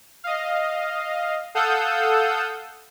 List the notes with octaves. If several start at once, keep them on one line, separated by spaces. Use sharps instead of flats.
D#5 F5
A4 F5 F#5 D#6 E6 G6